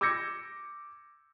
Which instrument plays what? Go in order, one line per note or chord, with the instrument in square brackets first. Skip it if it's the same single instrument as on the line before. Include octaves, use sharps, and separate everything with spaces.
[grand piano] D6 E6 G6 G#6 A#6 C#7